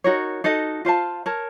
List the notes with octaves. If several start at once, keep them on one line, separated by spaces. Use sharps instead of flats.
D#4 F#4 A#4 C#5
D#4 F#4 A4 D#5
F4 C5 F5 A5
A#4 C#5 A5